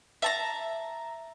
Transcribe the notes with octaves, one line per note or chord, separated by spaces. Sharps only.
E5 A5 A#5